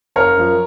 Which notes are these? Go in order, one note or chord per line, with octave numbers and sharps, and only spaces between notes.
F#1 A#4 C#5
F#2 F3